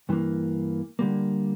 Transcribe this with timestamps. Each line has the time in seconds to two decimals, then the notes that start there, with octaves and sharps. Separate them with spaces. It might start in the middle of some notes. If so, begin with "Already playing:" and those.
0.09 G2 E3 A#3
0.99 D3 G3 A#3